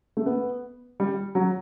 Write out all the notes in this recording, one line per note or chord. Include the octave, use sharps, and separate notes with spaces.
A3
B3
G3
F#3